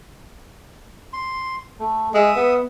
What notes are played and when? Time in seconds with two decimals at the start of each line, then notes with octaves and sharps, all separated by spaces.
1.13 C6
1.79 A3
2.14 G#3 E5 D#6
2.36 B3